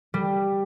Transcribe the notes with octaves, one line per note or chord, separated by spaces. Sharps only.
G3